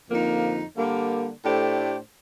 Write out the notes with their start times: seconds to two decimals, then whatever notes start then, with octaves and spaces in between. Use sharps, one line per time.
0.09 F2 D3 F3 A#3 D#4
0.77 D3 G3 A#3
1.44 A2 A3 D4 G4 C5